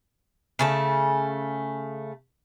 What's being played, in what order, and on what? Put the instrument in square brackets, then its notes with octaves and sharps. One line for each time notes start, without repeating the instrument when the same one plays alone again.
[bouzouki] C#3 A3 A5